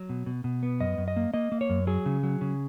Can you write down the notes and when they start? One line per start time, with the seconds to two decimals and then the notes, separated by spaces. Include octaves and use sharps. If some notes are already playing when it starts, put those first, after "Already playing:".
Already playing: F#3
0.09 B2
0.26 B2
0.44 B2
0.63 B3
0.80 F#2 D#5
0.98 F#2
1.08 D#5
1.16 A#3
1.34 A#3 D#5
1.52 A#3
1.61 C#5
1.70 F#2
1.87 F#3 G#4
2.06 C#3
2.23 F#3
2.41 C#3